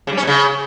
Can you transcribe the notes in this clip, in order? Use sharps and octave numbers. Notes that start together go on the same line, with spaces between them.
C#3
G3
C#4
B2
C#3